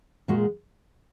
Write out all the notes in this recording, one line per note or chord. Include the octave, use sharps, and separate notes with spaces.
A#2 G#3 F#4